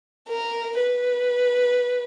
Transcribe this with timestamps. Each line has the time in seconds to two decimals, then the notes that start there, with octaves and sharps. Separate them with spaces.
0.28 A#4
0.80 B4